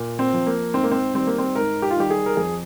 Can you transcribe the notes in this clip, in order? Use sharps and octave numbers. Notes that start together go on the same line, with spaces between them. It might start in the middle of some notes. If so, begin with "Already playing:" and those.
Already playing: A#2
C4
F3
A#3
G#2 C4
A#3
C4
D#3 G3 C4
A#3
C4
G#2 A#4
G4
F4
D#3 G3 G4
G#4
A#4
F2 G#4